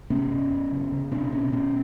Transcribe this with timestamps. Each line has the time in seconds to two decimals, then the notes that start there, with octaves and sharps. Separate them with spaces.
0.10 C3 B3 C#4
0.31 F#2
0.52 F#2
0.72 C#3
0.92 C#3
1.12 B2 C4 D4
1.32 B2 B3 C#4
1.52 B2 B3 C#4